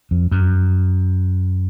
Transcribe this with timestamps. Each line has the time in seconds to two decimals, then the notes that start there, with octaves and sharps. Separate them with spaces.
0.11 F2
0.31 F#2